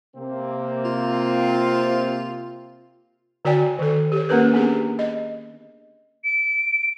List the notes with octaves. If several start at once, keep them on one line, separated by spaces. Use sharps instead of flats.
C3 A#3 C4
F4
D3 F#4 C#5 D5 G5 G#5
D#3 A4
G4 C#5
A#3 C#4 A#4 B4
B3 C#4 D4 G4 G#4
D#5
D7